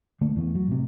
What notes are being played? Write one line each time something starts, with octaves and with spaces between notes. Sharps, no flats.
D3 A3 A#3
E2 E3 A3 B3
F#3
A2 C3